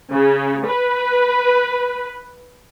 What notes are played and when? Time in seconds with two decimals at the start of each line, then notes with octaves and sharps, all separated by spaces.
0.12 C#3
0.68 B4